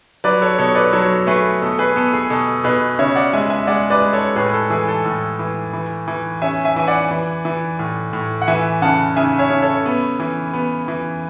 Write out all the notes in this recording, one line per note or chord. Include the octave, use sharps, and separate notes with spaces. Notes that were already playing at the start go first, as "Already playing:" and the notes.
F#3 B4 D5
A4 C#5
B2 A4 C#5
B4 D5
F#3 A4 C#5
A3 G#4 B4
B2 A4
G#4 B4
B3 A4
G#4
B2 A4
B2 G#4 B4
C#3 C#5 E5
D5 F#5
G#3 E5 G#5
E5 G#5
G#3 D5 F#5
B4 D5
G#3
A4 C#5
A2 G#4 B4
A4
E3 G#4
A4
A2
E3
E3
E3
C#4 E5 G#5
E5 G#5
E3 G#5
D5 F#5
E3
E3
A2
A2
F#5
E3 E5 G#5
C#3 F#5 A5
C#3 E5 G#5
C#5 E5
C#3
A4 C#5
B3
E3
B3
E3